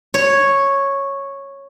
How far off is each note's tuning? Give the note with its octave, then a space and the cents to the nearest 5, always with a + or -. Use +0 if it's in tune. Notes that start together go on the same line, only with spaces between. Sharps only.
C#5 -5